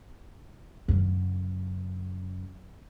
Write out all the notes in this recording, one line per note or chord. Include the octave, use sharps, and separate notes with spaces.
F#2 C#3